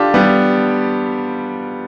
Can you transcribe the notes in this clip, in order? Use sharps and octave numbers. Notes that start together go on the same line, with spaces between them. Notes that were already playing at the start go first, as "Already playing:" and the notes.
Already playing: D4 F4 G4 A4
G3 B3